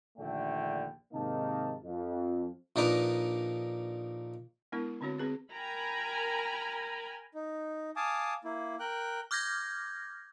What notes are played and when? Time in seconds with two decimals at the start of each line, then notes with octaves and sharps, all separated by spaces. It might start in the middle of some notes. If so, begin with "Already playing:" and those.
0.18 A#1 D#2 D3 A3 D5 G5
1.13 G#2 C3 D#3 A#3 D#4 A5
1.83 F2
2.76 A#1 D4 D#4 A#4 B4
4.72 G#3 B3 D4 E4 A#4
5.01 D3 C4 D4 F#4 C#5
5.18 C4 G#4 B4
5.52 A#4 G5 G#5 A#5 B5
7.34 D#4
7.96 F5 G#5 A5 D6 D#6
8.44 A#3 E4
8.80 A#4 G5 F#6
9.31 D6 F6 G6 G#6 A#6